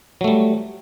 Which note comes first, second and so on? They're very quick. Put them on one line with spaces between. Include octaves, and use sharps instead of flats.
F#3 A3 G3